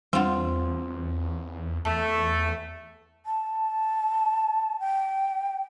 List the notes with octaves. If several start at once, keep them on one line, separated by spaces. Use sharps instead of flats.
E2 G3 C4 D4 F4 F#5
E2 A3 A5
A5
G5